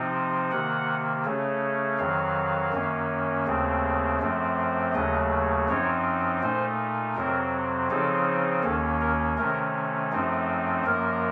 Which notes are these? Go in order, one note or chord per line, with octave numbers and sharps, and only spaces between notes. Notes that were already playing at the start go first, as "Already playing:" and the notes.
Already playing: C3 F3 C4 D#4
C3 D#3 A#3 F#5
C#3 A3 C#4
F2 D#3 F#3 F5
F#2 D#3 A#3 C#4
D#2 C#3 A3 C4
F#2 F3 A3 C4
D#2 C#3 F#3 A3 D#5
F#2 F3 C4 D#4 C#5
A#2 A3 D#4 C5
F2 C3 F#3 C4 A#4
C#3 F3 C4 D#4 A4
D#2 D#3 A#3 C#4 A4
A#4
C3 D#3 A3 C#4 A#4
F#2 F3 A3 C4 D#4
F#2 F3 A#3 A#4